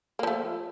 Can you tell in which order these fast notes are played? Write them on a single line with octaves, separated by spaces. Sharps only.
A#3 F3 A3